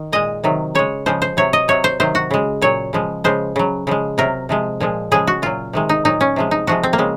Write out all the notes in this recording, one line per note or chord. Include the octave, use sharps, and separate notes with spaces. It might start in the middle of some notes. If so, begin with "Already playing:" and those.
Already playing: D#3
A#2 G#3 D#5
C3 D#3 F#3
C#3 G#3 C#5
C#3 F3 G#3 C5
C5
C3 F#3 C#5
D#5
C3 F#3 C#5
C5
C3 D#3 F#3 C5
F#4
C#3 G#3
A#2 F#3 C#5
C#3 F3 G#3
C#3 F3 G#3 C5
C#3 F#3
C#3 F3 G#3
C3 F#3 A#4
C3 F3 G#3
A#2 F3 G#3
C#3 F3 G#3 G#4
F#4
A#2 F#3 F4
C3 D#3 G#3
D#4
A#2 F#3 D#4
C#4
C3 F3 G#3
D#4
C3 F3 G#3 F#4
C4
A#3
C#3 G#3